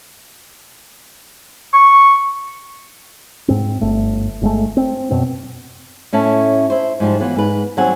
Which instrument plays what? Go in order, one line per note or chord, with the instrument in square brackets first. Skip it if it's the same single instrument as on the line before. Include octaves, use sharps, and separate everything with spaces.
[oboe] C#6
[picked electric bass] G#2 C4
G1 A3
G1 G#3 A3
C4
F#2 B2 C4
[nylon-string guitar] A2 C#4 E4 A5
E4 C5
G#2 F3 G3
E3 F#3 B3 F4
G#2 B4
D#2 F#3 G3 C4 F#5 G#5